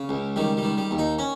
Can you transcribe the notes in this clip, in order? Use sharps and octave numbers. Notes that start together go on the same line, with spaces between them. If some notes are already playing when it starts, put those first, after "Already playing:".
Already playing: C#3
C#2
D#3 G3
G3
D#3
G3
D#2
D#4
C#4